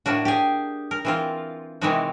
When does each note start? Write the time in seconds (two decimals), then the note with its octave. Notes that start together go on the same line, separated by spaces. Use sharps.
0.06 A2 A#3 D4 F#4
0.25 G4 G#4
0.91 A#4
1.05 E3 C4 F4
1.81 C3 D#3 E3 G#3 D#4 F#4